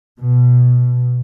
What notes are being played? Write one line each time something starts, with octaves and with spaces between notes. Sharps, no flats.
B2